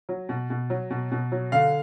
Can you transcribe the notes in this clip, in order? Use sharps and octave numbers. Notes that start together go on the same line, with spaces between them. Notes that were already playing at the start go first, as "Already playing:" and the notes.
F#3
B2
B2
F#3
B2
B2
F#3
D3 F5